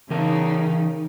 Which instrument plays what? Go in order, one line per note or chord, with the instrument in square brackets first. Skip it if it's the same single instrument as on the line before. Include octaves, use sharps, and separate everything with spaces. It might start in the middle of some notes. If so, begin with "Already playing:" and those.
[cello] C#3 D#4 [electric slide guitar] E3 A#4 A5